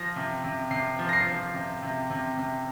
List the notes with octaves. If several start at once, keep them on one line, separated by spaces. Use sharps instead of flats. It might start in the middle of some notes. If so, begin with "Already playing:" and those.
Already playing: F3 A#6
C3
C3
C3 C7
F3
A#6
C7
F3
C3
C3
C3
C3